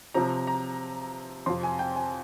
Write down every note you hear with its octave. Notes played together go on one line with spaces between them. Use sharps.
C3 F3 C4 A#5
A#5
F2 C3 F3 C6
G#5
G5
G#5